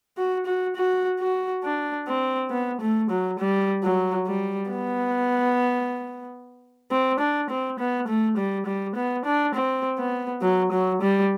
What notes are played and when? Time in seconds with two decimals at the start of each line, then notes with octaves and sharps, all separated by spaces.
0.17 F#4
0.46 F#4
0.76 F#4
1.20 F#4
1.64 D4
2.08 C4
2.51 B3
2.81 A3
3.11 F#3
3.39 G3
3.83 F#3
4.27 G3
4.71 B3
6.91 C4
7.20 D4
7.50 C4
7.80 B3
8.08 A3
8.37 G3
8.66 G3
8.96 B3
9.25 D4
9.55 C4
9.99 B3
10.42 F#3
10.72 F#3
11.02 G3